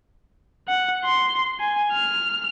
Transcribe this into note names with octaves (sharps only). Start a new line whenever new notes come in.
F#5
C6
G#5
F6